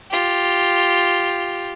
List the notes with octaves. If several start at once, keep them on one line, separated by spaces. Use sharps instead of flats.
F4 G4